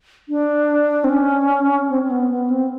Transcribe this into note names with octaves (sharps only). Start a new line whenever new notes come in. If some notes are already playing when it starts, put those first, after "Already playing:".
D4
C4
C#4
C4
C4
B3
B3
C4